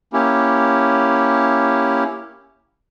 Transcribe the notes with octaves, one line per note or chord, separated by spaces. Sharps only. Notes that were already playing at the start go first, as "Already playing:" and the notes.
A#3 C#4 E4 G4